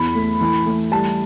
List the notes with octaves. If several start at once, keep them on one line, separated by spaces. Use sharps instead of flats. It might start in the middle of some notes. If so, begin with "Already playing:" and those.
Already playing: E2 B5
A3
E3
A3
G3 A5